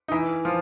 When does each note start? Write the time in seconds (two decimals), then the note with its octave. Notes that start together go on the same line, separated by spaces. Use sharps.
0.08 D#4
0.12 E3 E4
0.45 F3 F4